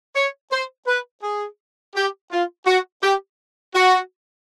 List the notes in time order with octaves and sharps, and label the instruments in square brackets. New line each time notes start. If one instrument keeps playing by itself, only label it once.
[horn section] C#5
C5
B4
G#4
G4
F4
F#4
G4
F#4